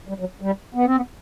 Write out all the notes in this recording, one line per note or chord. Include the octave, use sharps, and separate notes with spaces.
G3
F#3
G3
B3
C4
B3